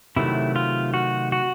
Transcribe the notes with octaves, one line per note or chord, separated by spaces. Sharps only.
C3 D#3 F#3 A3 E4
F4
F#4
F#4